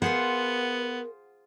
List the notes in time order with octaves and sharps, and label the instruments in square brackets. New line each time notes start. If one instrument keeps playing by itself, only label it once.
[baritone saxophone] B3 [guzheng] F4 G#4 C5 [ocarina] A#4 [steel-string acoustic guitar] F#5